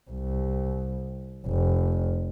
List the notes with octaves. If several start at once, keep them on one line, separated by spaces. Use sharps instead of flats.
C2
F1